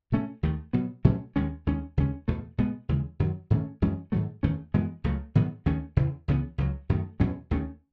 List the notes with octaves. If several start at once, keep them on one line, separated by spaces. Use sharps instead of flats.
B2 A3 C#4
D#2 D#3 A3
B2 F#3 B3
B2 F#3 A3 C#4
D#2 D#3 G#3 C#4
D#2 D#3 G#3 C#4
D#2 C#3 G#3 C#4
E2 B2 A3
B2 G#3 B3
D#2 C#3 E3 G#3
F#2 D#3 F#3
G#2 D#3 A3 C#4
F#2 E3 G#3 C#4
G#2 D#3 F#3 A3
E2 D#3 A3 C#4
F#2 E3 G#3 B3
C#2 C#3 F#3 A3
G#2 D#3 F#3 B3
D#2 D#3 A3 C#4
E2 C#3 E3
C#2 C#3 E3 B3
C#2 C#3 F#3
F#2 D#3 A3
E2 B2 F#3 C#4
D#2 D#3 A3 C#4